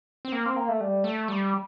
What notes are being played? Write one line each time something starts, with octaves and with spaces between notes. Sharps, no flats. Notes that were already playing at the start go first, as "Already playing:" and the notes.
C4
A#3
C4
A#3
A3
G3
A3
G3